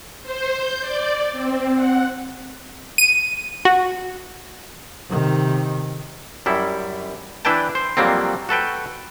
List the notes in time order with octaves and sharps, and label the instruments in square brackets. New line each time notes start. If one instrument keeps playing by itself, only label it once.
[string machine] C5
G6
D5
C4
F#5
[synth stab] D#7
F#4
[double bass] C3 D#3
[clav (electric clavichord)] F#2 G3 E4
E3 D4 E4 B4 G5 A5
C5
F2 F#3 G3 A#3 C4
F#4 A4 B4 G5